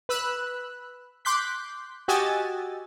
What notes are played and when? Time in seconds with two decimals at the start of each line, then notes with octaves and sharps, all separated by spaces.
0.09 B4 B5 E6 F#6
1.25 C6 D6 F#6 G6 B6
2.08 F#4 G4 D#5 G#5 E6 A6